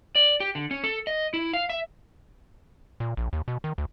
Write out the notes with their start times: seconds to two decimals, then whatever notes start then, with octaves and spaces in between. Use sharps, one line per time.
0.16 D5
0.40 G4
0.55 D3
0.71 C#4
0.84 A4
1.07 D#5
1.34 E4
1.53 F5
1.70 E5
3.00 A#2
3.17 A#1
3.33 D#2
3.48 B2
3.64 D#3
3.78 D2